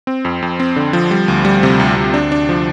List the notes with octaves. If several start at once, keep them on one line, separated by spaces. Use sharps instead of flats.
C4
F2
F2
C4
D3
F3
G3
D2
G3
C3
D2
D2
D4
D4
F3